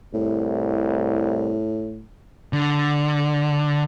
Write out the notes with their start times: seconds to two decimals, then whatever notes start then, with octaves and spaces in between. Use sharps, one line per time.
0.14 C2 A2
2.53 D3